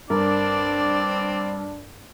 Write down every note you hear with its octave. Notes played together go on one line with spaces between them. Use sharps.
G2 C4 D4 A#4 D5